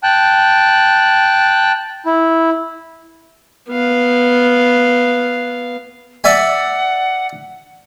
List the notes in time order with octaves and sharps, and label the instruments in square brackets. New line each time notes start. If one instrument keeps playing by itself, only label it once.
[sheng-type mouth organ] G5 A5 F#6
E4
[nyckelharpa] B3 F5
[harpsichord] D5 E5 G#5 [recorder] F#5